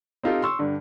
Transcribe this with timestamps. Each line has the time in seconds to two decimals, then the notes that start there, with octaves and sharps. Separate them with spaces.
0.23 C4 D#4 F4 G4 A4
0.42 C6 C#6 E6
0.59 G2 D3